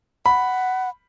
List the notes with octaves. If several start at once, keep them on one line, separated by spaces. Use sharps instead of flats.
F#5 B5